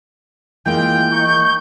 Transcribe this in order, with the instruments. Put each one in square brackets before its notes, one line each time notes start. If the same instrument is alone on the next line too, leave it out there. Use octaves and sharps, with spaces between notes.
[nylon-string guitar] E3 G#3 A#3 [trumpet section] F4 G5 [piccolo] G6
[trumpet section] D#4 C#6